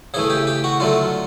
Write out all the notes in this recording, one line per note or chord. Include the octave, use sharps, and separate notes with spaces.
C#3 E3 A3 G#4
G4
G4
F#4
D3 F#3 A3 F4